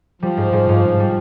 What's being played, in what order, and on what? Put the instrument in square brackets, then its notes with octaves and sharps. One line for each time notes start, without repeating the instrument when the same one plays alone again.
[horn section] F3 [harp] G3
[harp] G#2
G#2
G#2
G#2
G3